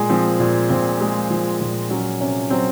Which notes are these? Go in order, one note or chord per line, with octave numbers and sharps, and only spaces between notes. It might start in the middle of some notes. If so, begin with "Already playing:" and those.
Already playing: A#2 G#3 G#4
F3 C4
A#2
A#2 C4
G#3
F3
A#2
F#3 C#4
C3 C#4
F#3 C4